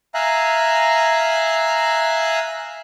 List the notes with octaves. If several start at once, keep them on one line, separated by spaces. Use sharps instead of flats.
E5 F5 G#5 A#5 F#6